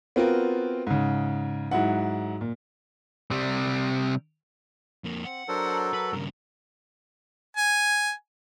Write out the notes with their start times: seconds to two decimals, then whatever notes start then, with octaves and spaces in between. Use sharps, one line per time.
0.16 B3 C4 F4 F#4 A#4
0.87 G#2 C#3
1.71 G#2 F#3 E4 F#5
2.41 A#2
3.31 C3 G3
5.04 F2 A#3
5.25 C4 F#5
5.48 F#3 D4 A4 A#4 C5
5.93 A#4 B4
6.13 G2 C#3
7.56 G#5